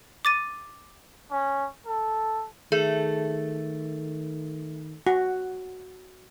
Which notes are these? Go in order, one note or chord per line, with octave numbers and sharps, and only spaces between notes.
D6 A6 D#7
C#4
A4
D#3 A3 G#4
F#4